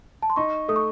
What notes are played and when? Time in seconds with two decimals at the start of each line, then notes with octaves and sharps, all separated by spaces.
0.22 A5
0.30 C6
0.36 D#4 C#6
0.68 A3 D#6
0.76 C#6